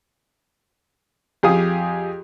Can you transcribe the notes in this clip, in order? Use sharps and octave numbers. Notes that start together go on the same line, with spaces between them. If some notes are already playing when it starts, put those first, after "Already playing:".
F2 G4 G#4 F5 D#6